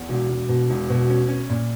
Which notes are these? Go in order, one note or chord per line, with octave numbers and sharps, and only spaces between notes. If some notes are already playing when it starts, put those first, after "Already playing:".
Already playing: E2
E1
E1
B2
E1
B2
C#4
C#4
A#2